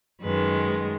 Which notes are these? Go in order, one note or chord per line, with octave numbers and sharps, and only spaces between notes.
F#2 D#3 G#3 B4